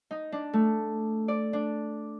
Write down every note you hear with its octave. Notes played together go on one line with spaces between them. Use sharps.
D#4
D4
A3
D5
D4